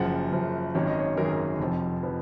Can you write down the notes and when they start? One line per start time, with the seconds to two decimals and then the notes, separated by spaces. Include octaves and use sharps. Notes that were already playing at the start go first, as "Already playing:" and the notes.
Already playing: F#1 F#2 F3 F#5
0.32 F#1 F#2 F3
0.75 G#1 F#2 D#3 C#5
0.87 D#5
0.99 C#5
1.17 G#1 F#2 D#3 A#4
1.25 G#4
1.33 A#4
1.59 F1 F2 F3
2.03 F3 B4